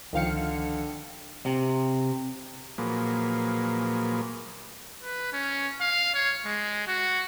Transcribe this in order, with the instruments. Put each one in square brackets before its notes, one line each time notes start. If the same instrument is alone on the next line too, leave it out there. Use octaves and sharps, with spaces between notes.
[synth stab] C#2 F5 C#7 [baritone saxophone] D3 [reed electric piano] D#3 F3 G5
[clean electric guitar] C3
[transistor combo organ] A#2 F3 F#3 A#3 G#4 B4
[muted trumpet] B4
C#4
F5
C#5
G#3
F#4